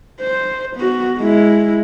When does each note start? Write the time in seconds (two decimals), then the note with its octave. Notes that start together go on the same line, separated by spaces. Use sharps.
0.21 C5
0.77 B3 F#4
1.19 G#3 E4